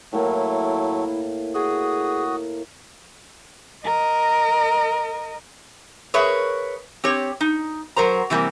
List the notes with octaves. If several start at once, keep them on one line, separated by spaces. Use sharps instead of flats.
A2 F#3 A3 A#3 E4
F#4 G#4 D#6
A#4 D#5
G#4 A#4 B4 C#5 E5
C4 G4 C#5
D#4
F#3 A#4 C5 A#5
C3 E3 G3 A#3 C4